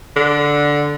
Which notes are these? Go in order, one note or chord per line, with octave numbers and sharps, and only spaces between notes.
D3